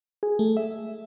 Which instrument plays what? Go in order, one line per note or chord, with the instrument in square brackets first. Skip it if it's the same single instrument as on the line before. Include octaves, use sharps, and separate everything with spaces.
[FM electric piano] G#4
A3
E5